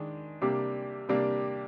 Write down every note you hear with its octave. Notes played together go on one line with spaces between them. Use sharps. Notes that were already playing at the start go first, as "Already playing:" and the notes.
Already playing: D#3 G#3 D4
C3 G3 A#3 D4 G4
C3 G3 A#3 D4 G4